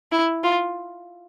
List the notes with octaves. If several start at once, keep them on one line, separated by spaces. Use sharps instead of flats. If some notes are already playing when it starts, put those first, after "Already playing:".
E4
F4